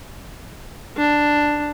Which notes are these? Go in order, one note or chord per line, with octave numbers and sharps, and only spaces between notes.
D4